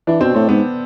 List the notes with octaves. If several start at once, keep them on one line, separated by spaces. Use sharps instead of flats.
E3 D4
B2 C4
A2 C4
G#2 B3